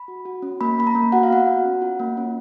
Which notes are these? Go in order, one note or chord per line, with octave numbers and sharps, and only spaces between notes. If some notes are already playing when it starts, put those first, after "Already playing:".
Already playing: B5
F#4
F#4
C#4
A#3 B5
A#3 B5
A#5
A#3
F#4 F#5
F5
B3 F#5
F#4
C#4
F4
A#3
C#4